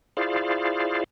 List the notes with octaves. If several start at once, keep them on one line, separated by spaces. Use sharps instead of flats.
E4 F4 G#4 C5 D5 F5